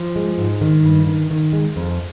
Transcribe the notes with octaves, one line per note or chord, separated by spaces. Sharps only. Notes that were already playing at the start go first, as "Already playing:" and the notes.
Already playing: F3
G#3
G#2
D#3
G2
D#3
D#3
G#3
F2